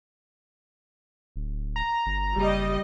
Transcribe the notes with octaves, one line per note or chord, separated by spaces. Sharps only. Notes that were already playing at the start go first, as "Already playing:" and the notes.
D1
A#5
G1
F#1 G3 G4 D#5